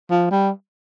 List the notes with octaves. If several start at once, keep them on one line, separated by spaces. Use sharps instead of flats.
F3
G3